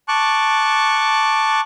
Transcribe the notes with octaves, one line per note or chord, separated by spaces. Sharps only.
A5 C#6 D6 F#6